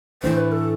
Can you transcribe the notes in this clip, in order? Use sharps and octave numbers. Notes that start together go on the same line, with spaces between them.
A2 E3 A3 D4 C5
B4
A4